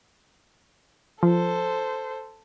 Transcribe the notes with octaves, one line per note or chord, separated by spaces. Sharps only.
F3 A4 C5